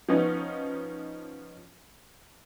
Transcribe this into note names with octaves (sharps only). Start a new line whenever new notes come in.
F3 B3 C#4 D#4